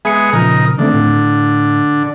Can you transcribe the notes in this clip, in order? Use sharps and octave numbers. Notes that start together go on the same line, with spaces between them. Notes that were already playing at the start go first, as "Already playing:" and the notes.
G#3 B3 G#4 E5 C#7
A#2 C#3 F3 D#4 A#4
D3 D#3 A3 C4
A2